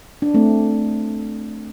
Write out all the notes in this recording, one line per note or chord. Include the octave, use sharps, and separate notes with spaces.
D4
A3 C4